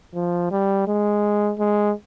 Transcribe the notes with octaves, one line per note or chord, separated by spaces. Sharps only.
F3
G3
G#3
G#3